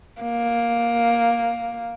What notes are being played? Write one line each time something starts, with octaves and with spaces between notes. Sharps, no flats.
A#3